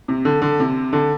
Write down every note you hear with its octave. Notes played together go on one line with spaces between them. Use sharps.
C3
D3
D3
C3
D3